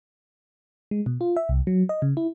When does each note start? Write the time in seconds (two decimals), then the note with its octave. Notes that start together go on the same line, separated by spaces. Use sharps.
0.91 G#3
1.06 B2
1.21 F4
1.37 E5
1.49 C2
1.67 F#3
1.89 D#5
2.02 C#3
2.17 E4